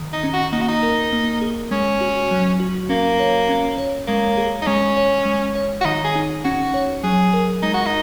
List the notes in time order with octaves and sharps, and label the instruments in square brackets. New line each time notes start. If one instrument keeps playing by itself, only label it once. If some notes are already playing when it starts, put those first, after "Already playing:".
Already playing: [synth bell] D#3
[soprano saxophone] D#4
[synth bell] C#4
[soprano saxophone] F#4
[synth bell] A#3 [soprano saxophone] D#4
[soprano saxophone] F#4
D#4
[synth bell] A#4
A#3
G#4
[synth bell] G#3 [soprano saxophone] C#4
[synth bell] F#4
F#3
F#4
[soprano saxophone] A#3 [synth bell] C#4
[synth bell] C#5
C#4
C#5
[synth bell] G#3 [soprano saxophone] A#3
[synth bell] G#4
[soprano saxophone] D#4
[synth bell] G#3 [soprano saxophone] C#4
[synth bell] C#5
G#3
C#5
[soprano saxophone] F#4
[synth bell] D#3 [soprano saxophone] D#4
[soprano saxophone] G#4
[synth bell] D#4
[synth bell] C#4 [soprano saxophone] F#4
[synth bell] C#5
[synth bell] F#3 [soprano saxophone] G#4
[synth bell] A#4
[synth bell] G#3 [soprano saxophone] D#4
[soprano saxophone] F#4
D#4